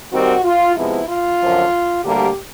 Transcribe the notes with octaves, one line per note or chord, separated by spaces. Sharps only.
D#2 D#3 G3 C4 F#4
F4
C3 F3 G#3 B3 E4
F4
F#2 D3 F3
D2 D3 G3 A#3 G4